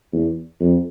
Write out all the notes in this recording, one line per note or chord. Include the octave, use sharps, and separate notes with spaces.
E2
F2